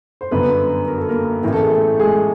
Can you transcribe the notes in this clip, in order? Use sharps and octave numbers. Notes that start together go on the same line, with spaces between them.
C5
G1 F#2 D3 B3 B4
A#4
A4
A#3 A#4
A1 A2 E3 A#4
A4
G#4
A3 A4
G#3 G#4